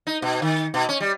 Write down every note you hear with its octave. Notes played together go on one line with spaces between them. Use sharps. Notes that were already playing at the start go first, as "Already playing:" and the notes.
D#4
B2
D#3
B2
C#4
G3